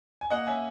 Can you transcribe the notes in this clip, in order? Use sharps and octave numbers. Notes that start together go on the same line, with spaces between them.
G#5
A#3 D#5 F#5
C#4 E5 G#5